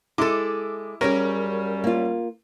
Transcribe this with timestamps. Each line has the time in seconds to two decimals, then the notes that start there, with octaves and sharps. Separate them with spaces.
0.18 G#3 E4 A4 D6
1.01 F#2 G3 C#4 G4 G#4 A#4
1.84 A#3 F4